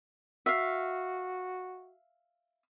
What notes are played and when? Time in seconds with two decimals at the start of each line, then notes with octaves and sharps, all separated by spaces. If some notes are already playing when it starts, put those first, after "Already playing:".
0.46 F#4 E5 F5